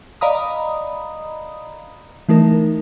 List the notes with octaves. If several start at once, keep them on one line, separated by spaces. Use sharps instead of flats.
D5 D#5 F5 A#5 B5 D#6
E3 A3 D#4 A#4